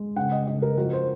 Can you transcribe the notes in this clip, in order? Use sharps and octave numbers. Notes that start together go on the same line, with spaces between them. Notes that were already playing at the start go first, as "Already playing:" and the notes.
Already playing: G#3
C#3 F#5
D#5
C#3 D#5
A#4
F3 F#4
C5